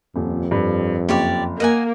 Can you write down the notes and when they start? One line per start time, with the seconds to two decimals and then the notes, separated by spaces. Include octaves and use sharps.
0.16 D#1 F2
0.51 G2
1.09 F#1 G4 C#5 D5
1.60 A#3 D#5 F#5 G#5